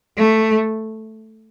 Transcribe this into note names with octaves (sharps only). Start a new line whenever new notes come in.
A3